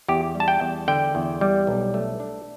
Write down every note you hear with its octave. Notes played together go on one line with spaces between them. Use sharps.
E2 G4
G3
A5
G5
E2
D3 G5
E2
G3
B1
A3
D4